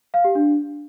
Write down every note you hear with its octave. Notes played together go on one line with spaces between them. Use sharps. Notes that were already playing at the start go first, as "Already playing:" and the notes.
F5
G4
D4